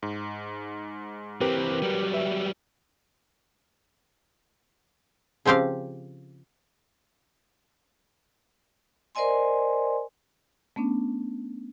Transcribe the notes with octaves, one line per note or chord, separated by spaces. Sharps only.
G#2
E3 C4 G4 A#4 B4
F#3 G3
B4 E5
C#3 F3 C4 G4 F5
A#4 C5 D5 D#5 G#5 C6
A3 B3 C#4 D4